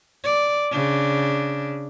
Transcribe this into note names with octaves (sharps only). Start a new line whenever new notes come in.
D5
C#3 D4